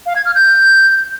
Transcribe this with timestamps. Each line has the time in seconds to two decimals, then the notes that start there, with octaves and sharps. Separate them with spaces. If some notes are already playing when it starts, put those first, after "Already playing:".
0.06 F5
0.16 G#6
0.26 F6
0.35 G6